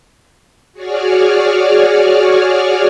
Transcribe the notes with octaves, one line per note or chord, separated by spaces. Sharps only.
F#4 G#4 C#5 D5 F6